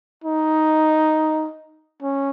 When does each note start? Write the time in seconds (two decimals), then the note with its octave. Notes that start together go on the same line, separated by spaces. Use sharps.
0.24 D#4
2.02 C#4